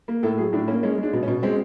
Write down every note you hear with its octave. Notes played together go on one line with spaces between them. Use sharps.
A#3
A2 A4
F#3 G#4
A2 D4
A#3 C#4
G#3 C#4
G#3 D4
B2
C#4
B2
G#3 C4